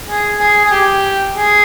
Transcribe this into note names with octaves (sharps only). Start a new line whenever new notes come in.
G#4
G#4
G#4
G4
G#4